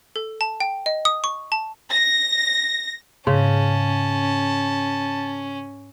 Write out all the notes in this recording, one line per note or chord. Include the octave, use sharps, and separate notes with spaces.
A4
A5
G5
D#5
D#6
C#6
A5
A#6
G#2 C#3 C#4 A5